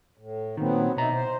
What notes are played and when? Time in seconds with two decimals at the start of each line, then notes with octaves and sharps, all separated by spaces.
0.17 A2
0.57 A#2 D#3 F#3 B3 C4
0.96 B2 D#4 E4 A#5
1.14 C5